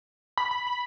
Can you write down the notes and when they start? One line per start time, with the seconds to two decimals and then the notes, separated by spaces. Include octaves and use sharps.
0.38 B5
0.51 B5
0.67 B5